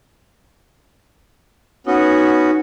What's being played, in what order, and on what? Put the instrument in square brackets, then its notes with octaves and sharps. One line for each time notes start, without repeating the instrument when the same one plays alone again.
[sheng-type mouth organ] B3 C#4 F#4 [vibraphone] D#4